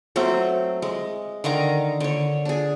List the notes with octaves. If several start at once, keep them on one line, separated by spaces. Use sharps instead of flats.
F#3 A3 C4
G#3
D3 D#3 F5 A#5
D3 C#5
D4 G#4